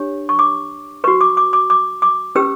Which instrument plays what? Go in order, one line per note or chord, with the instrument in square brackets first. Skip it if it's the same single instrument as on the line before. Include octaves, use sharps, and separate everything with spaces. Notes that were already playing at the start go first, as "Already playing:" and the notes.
Already playing: [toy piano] D4 G4 C#5
C#6
D6
F#4 B4 C#6
D6
D6
D6
D6
D6
C#4 G4 B4 E6